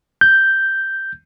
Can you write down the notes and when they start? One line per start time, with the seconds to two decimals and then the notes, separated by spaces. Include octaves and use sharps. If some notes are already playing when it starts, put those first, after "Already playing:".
0.21 G6